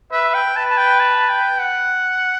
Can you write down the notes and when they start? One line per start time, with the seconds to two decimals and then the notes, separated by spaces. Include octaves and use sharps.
0.11 B4 E5
0.34 G5
0.56 B4 A5
0.70 A5
0.78 G5
1.00 A5
1.29 G5
1.60 F#5